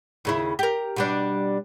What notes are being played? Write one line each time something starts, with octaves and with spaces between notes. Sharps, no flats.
D#2 C#3 E4
G4 A#4
B2 G3 D4